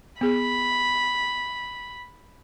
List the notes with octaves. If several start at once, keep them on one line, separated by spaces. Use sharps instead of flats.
B3 G#4 B5